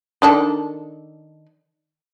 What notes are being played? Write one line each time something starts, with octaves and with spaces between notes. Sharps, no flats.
D#3 D4 A4